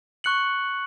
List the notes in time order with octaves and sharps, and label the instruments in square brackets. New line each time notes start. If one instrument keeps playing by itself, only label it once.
[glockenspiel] C#6 F#6 C#7 F#7